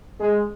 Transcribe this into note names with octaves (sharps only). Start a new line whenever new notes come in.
G#3